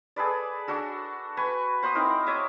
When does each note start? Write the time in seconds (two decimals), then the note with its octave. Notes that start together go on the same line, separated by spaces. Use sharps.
0.16 G#4 A4 B4 D5
0.67 D4 F#4 A4
1.37 B4 G#5 C#6
1.83 C5 F#5 C6 D#6
1.95 C4 D#4 E4 A#4
2.26 C#5 E5 D6 D#6